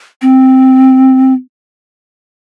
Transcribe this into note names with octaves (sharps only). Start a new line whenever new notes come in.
C4